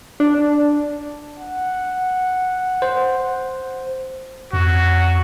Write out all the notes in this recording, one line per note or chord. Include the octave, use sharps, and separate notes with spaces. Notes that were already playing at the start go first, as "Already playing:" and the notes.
D4
F#5
C5
F2 F#4